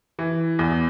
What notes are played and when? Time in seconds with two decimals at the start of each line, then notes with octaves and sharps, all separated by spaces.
0.19 E3
0.59 E2